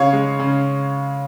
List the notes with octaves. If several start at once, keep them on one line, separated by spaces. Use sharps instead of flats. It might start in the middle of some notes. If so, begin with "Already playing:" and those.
Already playing: C#3 C#5 F5
G#3
C#3